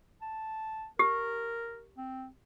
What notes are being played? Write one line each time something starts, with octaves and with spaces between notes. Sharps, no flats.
A5
G4 A#4
C4